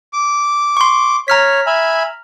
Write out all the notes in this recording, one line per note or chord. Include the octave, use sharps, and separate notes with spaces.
D6
C6 C#6
C#5 A#5 F6 B6
E5 G#5 B5